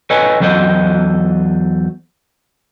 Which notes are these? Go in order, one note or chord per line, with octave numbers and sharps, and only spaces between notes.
A4 B4 C#5 D#5 G#5
E2 F#3 A4 C5 D#5